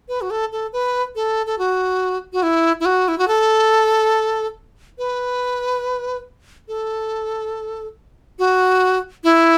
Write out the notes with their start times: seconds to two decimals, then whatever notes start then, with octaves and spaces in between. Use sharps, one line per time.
0.09 B4
0.21 F#4
0.31 A4
0.52 A4
0.73 B4
1.15 A4
1.46 A4
1.58 F#4
2.33 F#4
2.43 E4
2.80 E4
2.85 F#4
3.08 E4
3.18 F#4
3.28 A4
4.98 B4
6.68 A4
8.39 F#4
9.24 E4